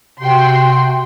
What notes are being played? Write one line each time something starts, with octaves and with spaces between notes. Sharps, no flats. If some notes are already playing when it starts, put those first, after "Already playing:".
C3 F#4 G5 C6